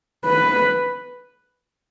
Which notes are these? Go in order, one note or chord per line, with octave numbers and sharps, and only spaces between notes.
B4